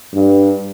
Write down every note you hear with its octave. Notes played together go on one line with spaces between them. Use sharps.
G2